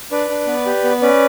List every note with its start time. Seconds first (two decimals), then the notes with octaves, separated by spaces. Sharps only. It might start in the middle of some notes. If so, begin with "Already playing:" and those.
0.11 D4 B4 D5
0.29 D4
0.47 B3
0.66 G4
0.84 B3
1.02 C#4 B4 D5